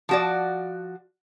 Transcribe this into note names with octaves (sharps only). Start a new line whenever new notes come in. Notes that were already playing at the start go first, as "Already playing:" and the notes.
F3 F#4 D5